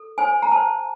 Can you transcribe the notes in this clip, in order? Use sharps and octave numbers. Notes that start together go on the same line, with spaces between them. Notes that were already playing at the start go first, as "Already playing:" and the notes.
Already playing: A4
C5 G#5
A#5
C5 A5